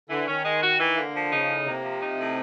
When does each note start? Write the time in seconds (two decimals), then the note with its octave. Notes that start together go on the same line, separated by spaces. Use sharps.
0.10 D3 E3
0.27 D#3 C#4
0.45 G#3
0.62 F#4
0.80 E3
0.97 D3 A#3
1.14 F3
1.31 C#3 D#4
1.49 A2
1.66 C3 A#3
1.84 F3
2.01 D#4
2.19 A2